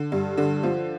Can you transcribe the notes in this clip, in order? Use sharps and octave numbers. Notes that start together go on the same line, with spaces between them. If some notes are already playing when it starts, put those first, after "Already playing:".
Already playing: D3
G2
D3
F3